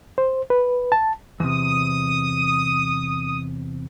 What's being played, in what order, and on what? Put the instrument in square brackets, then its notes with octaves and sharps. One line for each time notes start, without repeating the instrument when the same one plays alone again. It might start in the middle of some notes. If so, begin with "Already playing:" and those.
[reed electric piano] C5
B4
A5
[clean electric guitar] E2 C3 [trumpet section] D#6